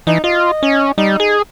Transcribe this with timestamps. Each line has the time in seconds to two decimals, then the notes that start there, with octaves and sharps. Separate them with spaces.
0.07 E3 D#4
0.24 F4 D#5
0.63 C#4
0.98 G3 D#4
1.20 G#4